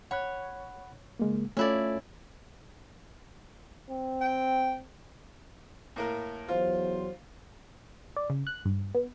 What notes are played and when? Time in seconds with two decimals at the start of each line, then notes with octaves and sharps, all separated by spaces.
0.11 C#5 F#5 B5 F#6
1.19 C#3 G#3 A#3
1.57 A3 C#4 E4 F4 A4 D5
3.89 C4
4.21 G5
5.96 A2 A#3 A#4
6.48 E2 F#3 F4 C5
8.17 D5
8.30 C#3
8.47 F#6
8.65 G2
8.95 B3